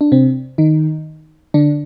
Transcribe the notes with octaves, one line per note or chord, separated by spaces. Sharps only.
D4
C3 C4
D#3 D#4
D3 D4